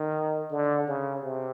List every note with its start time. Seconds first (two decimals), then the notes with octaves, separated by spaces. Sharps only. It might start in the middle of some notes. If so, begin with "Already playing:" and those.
Already playing: D#3
0.51 D3
0.87 C#3
1.23 C3